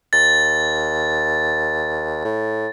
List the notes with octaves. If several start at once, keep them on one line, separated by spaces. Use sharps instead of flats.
D#2 A6
A2